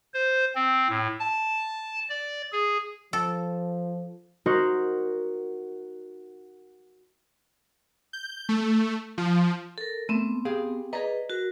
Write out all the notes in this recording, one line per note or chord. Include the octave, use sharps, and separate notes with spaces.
C5
C4
A2
A5
D5
G#4
F3 A4
D#4 F#4 A#4 C5
G6
A3
F3
A4 A#4
A3 B3 C4
G4 G#4 F5
G#4 B4 D5 D#5 A#5
F#4 A#4